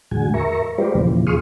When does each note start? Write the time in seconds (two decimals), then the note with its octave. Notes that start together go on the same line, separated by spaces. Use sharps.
0.11 E2 A2 D3 G#3 F#4 G#5
0.34 A#4 E5 A#5 C#6
0.78 G#3 F4 G4 B4 C5 D5
0.95 E2 A#2 C#3 E3 F3
1.27 F4 G#4 C6 C#6 D#6 F6